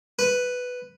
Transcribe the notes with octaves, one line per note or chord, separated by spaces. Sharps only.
B4